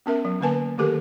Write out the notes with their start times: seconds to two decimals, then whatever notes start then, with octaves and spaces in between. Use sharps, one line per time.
0.06 B3 C#4 A#4 E5
0.25 F#3
0.41 D3 A#3 B4 G#5 A5
0.78 D#3 A3 G4 A4 A#4